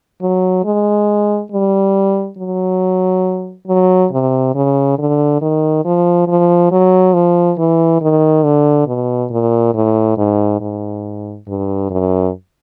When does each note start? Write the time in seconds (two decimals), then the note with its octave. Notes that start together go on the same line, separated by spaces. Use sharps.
0.22 F#3
0.65 G#3
1.52 G3
2.38 F#3
3.68 F#3
4.11 C3
4.55 C#3
4.99 D3
5.42 D#3
5.85 F3
6.28 F3
6.72 F#3
7.14 F3
7.58 E3
8.02 D#3
8.44 D3
8.87 B2
9.31 A#2
9.75 A2
10.18 G#2
10.61 G#2
11.48 G2
11.91 F#2